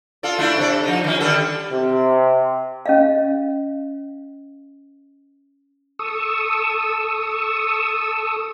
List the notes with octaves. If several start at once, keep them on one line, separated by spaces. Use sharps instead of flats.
F4 A4 D5
A3 D4 E4
C3 A4 D5
F3 D#4
D#3 C#4
D3 G3 A4
C3
C#4 D#5 F5
A4 C#6 D#6 E6